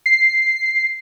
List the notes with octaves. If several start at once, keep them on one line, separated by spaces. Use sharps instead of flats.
C7